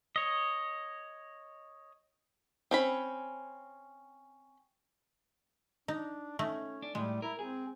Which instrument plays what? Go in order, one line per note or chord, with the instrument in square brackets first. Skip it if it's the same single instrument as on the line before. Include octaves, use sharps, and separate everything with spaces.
[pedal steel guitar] C#5 D#5
[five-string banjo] C4 C#4 B5
[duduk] D4 [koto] D#4
[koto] A3 D#4 [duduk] C#4
[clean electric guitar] D4
[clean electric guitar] A2 [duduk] G3 [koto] G#3
[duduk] E4 [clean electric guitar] A#4
[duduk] C4 [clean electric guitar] G#4